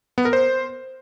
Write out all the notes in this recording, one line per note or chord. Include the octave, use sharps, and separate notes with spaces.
B3
A#4
C5